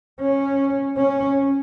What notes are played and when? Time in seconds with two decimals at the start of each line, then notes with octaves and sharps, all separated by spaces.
0.20 C#4
0.97 C#4